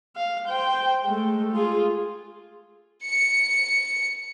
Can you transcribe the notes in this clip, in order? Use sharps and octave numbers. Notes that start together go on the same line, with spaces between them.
F5
C5 G5
G#3 A3
F4 G#4
C#7